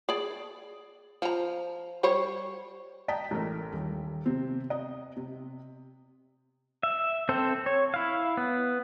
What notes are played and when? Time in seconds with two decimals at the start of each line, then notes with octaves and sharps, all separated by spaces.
0.09 G#4 D5
1.22 F3 A#5
2.03 G3 C5 C#5
3.08 D#5 G5 A5 A#5 B6
3.31 A1 A3 A#4
3.72 D#1
4.26 C3 C4
4.70 D#5
5.17 C3
6.83 E5
7.29 C4 A4 C5
7.66 C#5
7.94 E4 F5
8.37 B3